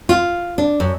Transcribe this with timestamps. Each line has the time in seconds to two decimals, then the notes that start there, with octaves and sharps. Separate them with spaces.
0.09 F4
0.58 D4
0.80 F#2